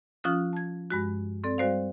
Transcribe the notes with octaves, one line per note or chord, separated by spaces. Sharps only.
F3 C#4 F4 D#6 F6 F#6
A5 G#6
G2 G#3 F#4
C4 A4 D5
G3 F#4 C5 D5 F5